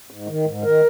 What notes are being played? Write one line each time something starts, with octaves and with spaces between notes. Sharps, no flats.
G#2
D#3
G#2
D#3 A#4